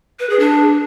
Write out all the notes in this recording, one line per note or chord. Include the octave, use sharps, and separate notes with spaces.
B4
G#4
D4